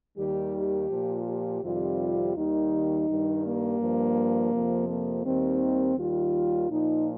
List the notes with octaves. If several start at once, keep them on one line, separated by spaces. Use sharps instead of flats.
D#2 D#3 G3 G4
G4
A#2 F3
G4
F2 C3 D#3 G3 F4
D#2 D#3 G3 D#4
G2 D#3 G3
A#3
G2 F3
F2 C3 F3
A#3
D#2 D#3 G3 C4
D#2 D#3 G3 F4
A#2 F3 D#4